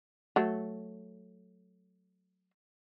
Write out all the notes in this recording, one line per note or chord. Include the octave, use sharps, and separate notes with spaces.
F#3 A3